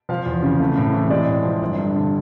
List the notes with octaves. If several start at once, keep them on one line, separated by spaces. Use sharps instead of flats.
F3 F5
E2
C#3
A3
A2
E3
G#3 D5
A2
F3
G1
G2
D3